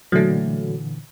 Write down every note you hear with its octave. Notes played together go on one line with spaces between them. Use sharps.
A#2 D3 E3 F#3 A3